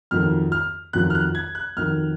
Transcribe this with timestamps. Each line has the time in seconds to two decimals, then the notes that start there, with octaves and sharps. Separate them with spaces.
0.11 F2 D#3 F#3 F6
0.52 F6
0.93 F2 D#3 F#3 F#6
1.10 F6
1.15 F#6
1.35 G#6
1.55 F#6
1.77 F2 D#3 F#3 F6